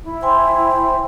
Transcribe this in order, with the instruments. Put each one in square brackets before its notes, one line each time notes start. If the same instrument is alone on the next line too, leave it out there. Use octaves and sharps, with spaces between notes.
[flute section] E4
[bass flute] C5 [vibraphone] G5 G#5 C6